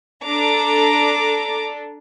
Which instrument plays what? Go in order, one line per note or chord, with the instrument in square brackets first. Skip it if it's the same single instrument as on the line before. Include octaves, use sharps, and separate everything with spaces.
[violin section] D4 A4 A#5 D6